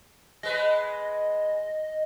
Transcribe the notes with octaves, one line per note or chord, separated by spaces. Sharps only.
G#3 B4 D#5